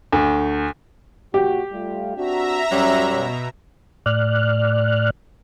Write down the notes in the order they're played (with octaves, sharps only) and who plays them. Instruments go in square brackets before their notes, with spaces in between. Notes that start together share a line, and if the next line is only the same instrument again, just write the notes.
[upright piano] D2
[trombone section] A#2 F#4 [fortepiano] G4
[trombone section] G3 A3 F4
[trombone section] C4 D4 F#4 [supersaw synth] E5 A#5
[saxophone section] F#2 F#3 G3 [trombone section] C#4
[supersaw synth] B2
[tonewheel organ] A2 D5 F6 F#6